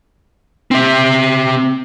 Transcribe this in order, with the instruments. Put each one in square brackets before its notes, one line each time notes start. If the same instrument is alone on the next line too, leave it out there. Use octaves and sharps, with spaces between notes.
[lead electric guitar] C4 E5